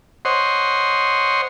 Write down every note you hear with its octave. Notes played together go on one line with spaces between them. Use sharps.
C5 C#5 D#5 F#5 C6